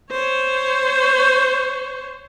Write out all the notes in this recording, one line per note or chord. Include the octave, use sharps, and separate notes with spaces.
C5 C#5